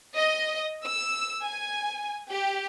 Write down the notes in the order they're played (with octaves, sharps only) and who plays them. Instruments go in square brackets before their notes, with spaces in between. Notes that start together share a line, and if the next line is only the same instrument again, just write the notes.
[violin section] D#5
E6
G#5
G4